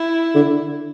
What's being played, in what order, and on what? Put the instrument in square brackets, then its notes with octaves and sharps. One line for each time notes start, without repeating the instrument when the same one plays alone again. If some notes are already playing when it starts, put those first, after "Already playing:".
Already playing: [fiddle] E4
[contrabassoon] D3